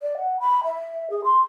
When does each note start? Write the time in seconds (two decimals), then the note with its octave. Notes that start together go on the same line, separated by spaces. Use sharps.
0.02 D5
0.17 F#5
0.40 B5
0.64 E5
1.10 G#4
1.24 C6